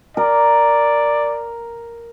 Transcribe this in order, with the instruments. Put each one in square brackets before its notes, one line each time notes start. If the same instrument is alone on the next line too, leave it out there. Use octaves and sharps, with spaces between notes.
[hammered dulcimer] A#4 [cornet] D5